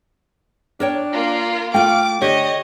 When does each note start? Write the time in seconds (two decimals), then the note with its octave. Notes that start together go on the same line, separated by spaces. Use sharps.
0.80 D4 A#4 C#5 G5
1.13 A#3 F4
1.74 A3 F4 F5 G5 D6
2.22 D3 D4 G4 C#5 D#5